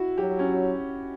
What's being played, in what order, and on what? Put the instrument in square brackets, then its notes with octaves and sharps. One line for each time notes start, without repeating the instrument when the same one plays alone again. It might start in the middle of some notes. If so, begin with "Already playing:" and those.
Already playing: [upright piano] E4 F#4
[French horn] F#3 [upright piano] G4
[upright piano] C#4